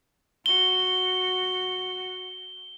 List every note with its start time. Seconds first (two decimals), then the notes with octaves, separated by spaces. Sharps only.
0.46 F#4 G7